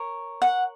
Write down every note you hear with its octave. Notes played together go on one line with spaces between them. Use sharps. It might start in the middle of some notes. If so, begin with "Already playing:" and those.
Already playing: A#4 C#5
F#5